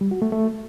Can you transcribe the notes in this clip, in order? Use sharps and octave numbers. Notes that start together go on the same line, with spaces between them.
G3
F#4
A3
A3